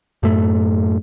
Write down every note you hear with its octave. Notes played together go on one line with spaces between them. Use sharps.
F#2 A2 A3